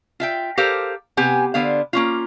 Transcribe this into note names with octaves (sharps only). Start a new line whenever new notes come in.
F4 E5 G5
G4 A4 A#4 C5 F5
C3 B3 G4 G#5
D3 B3 C5 F5
A#3 C#4 F4